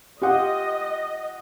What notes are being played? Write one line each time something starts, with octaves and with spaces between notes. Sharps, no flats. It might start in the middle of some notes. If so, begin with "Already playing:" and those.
F4 G4 D#5 F#5